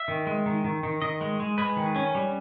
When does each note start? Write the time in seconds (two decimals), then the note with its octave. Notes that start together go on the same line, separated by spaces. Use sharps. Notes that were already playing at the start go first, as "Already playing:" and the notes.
Already playing: E5
0.08 D#3
0.27 G#3
0.46 D#3
0.64 D#3
0.83 D#3
1.02 D#3 D#5
1.21 G#3
1.40 G#3
1.58 G#3 B4
1.77 D#3
1.96 C#4
2.15 G3